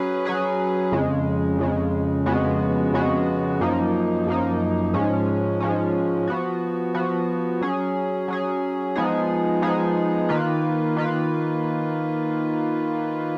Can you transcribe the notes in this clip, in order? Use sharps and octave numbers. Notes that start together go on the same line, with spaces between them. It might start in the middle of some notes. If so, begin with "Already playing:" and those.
Already playing: F#3 C#4 G#4 B4
F#3 C#4 G#4 B4
F2 C#3 G#3
F2 C#3 G#3
F2 C#3 G#3 B3 F#4
F2 C#3 G#3 B3 F#4
F#2 F3 A#3 D#4
F#2 F3 A#3 D#4
G#2 F3 G#3 C#4
G#2 F3 G#3 C#4
F3 B3 F#4
F3 B3 F#4
F#3 C#4 G#4
F#3 C#4 G#4
F3 G#3 B3 D#4 G#4
F3 G#3 B3 D#4 G#4
D#3 A#3 F4 B4
D#3 A#3 F4 B4